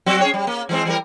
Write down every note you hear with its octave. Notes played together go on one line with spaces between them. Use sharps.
F#3 C4 F#4
C#4 G#4 C#5
G3
A#3
E3 G#3 C4
E3 G3 A#4